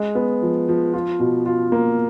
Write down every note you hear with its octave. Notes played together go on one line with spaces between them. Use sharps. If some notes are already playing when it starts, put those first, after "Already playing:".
Already playing: G#3
B3
F3
F3
F4
B2
F4
A#3